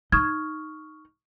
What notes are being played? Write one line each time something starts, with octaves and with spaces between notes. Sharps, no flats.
D#4 C#6 D#6 F6 G#6